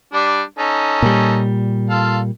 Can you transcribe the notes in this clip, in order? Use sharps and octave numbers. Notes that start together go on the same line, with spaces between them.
G3 D4
C#4 D#4 A4
A#2 G3
F4 A4 F5